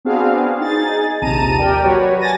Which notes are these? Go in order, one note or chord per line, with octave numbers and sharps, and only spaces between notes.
B3 C4 D4 F#4 G#4 F5
D#4 G#4 A6
A#1 D#2 C3 A5 A#5 D#7
G4 A#4 D5 G5
F#3 F#4 B4 C#5
G#5 A5 A6 A#6 D#7